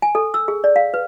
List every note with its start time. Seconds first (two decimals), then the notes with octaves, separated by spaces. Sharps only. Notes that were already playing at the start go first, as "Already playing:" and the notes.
0.02 G#5
0.15 A4
0.34 E6
0.48 G#4
0.64 D5
0.76 F5
0.94 B4